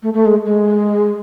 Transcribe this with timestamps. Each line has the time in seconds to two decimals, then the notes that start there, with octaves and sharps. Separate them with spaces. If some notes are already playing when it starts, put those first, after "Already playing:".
0.03 A3
0.14 A3
0.26 G#3
0.46 G#3